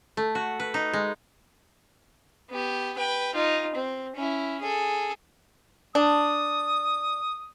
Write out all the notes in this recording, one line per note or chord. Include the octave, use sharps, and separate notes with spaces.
A3
F#4
B4
D#4
G#3
B3 G4
B4 G5
D#4 F4
C4
C#4 E4
G#4 A4
D4 D#6